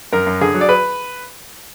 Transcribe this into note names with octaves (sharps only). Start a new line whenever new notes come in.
F#2 A#4
F#2
D3 G#4
F#3
D5
B4